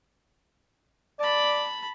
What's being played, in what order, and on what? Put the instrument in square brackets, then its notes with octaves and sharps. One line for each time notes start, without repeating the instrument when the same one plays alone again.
[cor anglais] D5 [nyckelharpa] A5 B5